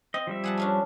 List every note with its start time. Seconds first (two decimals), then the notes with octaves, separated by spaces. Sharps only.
0.14 C4 D#5
0.27 F3 G3 E5
0.44 G#4 F#5 A5
0.58 A3 C#4 D4